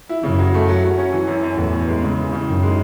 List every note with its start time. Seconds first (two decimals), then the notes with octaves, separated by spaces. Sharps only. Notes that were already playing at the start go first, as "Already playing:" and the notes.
0.09 E4
0.23 F#2 C#3
0.39 F#3
0.54 A3
0.68 F#3
0.84 F#3
0.98 C#4
1.13 E3
1.28 F#2
1.43 F#2
1.58 E2 A2
1.73 A2
1.88 G#3
2.03 C#3
2.18 E3
2.32 C#3
2.48 F#2 D#3
2.63 G#3